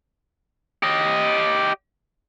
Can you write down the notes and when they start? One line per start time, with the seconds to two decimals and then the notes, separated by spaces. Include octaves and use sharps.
0.83 G4 D#5